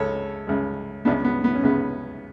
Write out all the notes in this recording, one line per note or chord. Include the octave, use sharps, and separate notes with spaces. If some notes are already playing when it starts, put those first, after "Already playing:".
Already playing: C#2 C#3 G#3 A4 C#5
C#2 C#3 G#3
C#2 C#3 G#3 B3 D4
B3
B3
C#4
C#2 C#3 G#3 B3